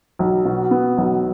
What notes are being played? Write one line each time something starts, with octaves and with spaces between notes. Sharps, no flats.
B1
B2
B3
B1